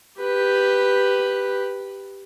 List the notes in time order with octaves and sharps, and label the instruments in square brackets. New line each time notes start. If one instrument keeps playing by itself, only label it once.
[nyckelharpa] G4 B4